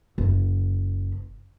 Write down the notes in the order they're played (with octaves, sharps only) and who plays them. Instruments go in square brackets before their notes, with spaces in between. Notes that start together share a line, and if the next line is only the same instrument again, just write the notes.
[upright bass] F#1